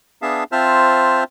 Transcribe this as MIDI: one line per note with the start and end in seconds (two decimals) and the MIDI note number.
0.22 0.44 59
0.22 0.44 62
0.22 0.44 68
0.22 0.44 76
0.22 0.44 77
0.22 0.44 81
0.52 1.24 60
0.52 1.24 65
0.52 1.24 72
0.52 1.24 76
0.52 1.24 81
0.52 1.24 89